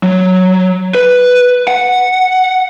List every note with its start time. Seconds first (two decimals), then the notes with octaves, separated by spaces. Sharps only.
0.03 F#3
0.95 B4
1.68 F#5